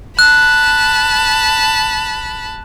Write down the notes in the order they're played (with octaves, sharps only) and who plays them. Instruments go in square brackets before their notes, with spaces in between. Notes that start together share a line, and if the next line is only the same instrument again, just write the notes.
[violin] A5 B5 [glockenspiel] F#6